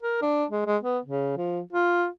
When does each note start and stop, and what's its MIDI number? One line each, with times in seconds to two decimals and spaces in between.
0.03 0.20 70
0.22 0.45 62
0.50 0.66 56
0.66 0.77 56
0.83 0.98 59
1.05 1.33 49
1.37 1.60 53
1.73 2.07 65